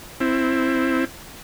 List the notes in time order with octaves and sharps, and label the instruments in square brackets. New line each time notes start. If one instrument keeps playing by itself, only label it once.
[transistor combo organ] C4 E4